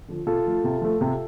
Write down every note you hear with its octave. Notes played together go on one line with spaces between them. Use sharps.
D3 F3
C3 F4 A4
F3 A3
C3
F3 A3
C3